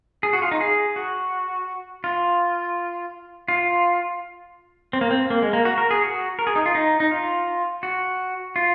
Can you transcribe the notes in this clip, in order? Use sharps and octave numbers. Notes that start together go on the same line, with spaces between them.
G#4
F#4
F4
D#4
G#4
F#4
F4
F4
C4
A#3
C4
A#3
G#3
A#3
F#4
A#4
G#4
F#4
A#4
G#4
D#4
F4
D#4
D#4
F4
F#4
F4